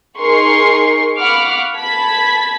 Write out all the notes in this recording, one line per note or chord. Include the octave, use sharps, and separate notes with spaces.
D#4 G#4 A#4 C6 C#6 C7
F5 F#5 B5 C#6 D6 F6
A5 B5 G#6 B6